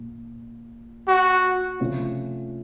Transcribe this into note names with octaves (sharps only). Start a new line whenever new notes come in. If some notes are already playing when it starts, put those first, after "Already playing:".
Already playing: A#2
F#4
C3 F3 A3 C#4 F4